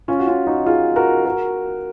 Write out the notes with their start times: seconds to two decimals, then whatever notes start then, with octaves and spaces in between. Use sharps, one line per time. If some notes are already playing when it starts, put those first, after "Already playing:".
0.08 C#4 F4
0.19 F#4
0.27 C#4 F4
0.47 D#4 F#4
0.66 F4 G#4
0.96 F#4 A#4
1.25 F#4 A#4